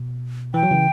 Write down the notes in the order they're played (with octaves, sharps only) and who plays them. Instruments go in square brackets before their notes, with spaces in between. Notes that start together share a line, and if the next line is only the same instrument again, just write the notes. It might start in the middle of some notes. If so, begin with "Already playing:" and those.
Already playing: [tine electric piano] B2
[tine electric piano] E3 [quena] G5
[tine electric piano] F#3
C#3 E3